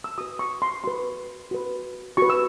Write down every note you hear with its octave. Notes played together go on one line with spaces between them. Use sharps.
E6
F#4 B4 D#6
C#6
C6
F#4 B4 C6
F#4 B4
F#4 B4 C#6
E6